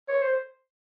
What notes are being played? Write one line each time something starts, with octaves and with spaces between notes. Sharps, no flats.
C#5
C5